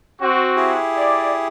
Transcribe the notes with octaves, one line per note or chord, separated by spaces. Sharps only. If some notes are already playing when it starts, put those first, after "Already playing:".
C4 F#4
E4 G4 G#4
D5